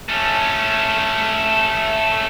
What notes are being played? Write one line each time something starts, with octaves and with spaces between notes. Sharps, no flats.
A3 C#4